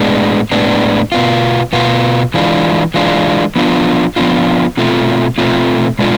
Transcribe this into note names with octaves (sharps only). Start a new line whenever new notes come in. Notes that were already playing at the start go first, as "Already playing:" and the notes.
Already playing: A2 G#3 B3 D4
A2 G#3 B3 D4
B2 B3 F4
B2 B3 F4
E3 G#3 D4 F4
E3 G#3 D4 F4
F3 B3 D4 F4
F3 B3 D4 F4
B2 A3 C4 F4
B2 A3 C4 F4
B2 G#3 D4 F4